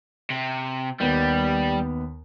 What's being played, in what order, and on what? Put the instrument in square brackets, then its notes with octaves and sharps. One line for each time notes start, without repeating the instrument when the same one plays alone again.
[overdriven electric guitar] C3
[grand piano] D#2 B3 [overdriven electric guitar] G3